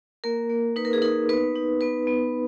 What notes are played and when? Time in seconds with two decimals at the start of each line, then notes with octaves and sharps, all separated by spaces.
0.24 A#3 A#4
0.50 A#3
0.76 D#4 B4
0.85 A#4
0.93 G#4
1.02 D#4 A#4
1.29 B3 B4
1.55 D#4
1.81 B3 B4
2.07 B3